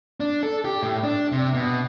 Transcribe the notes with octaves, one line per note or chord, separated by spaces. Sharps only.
D4
A4
G4
A2
D4
C3
B2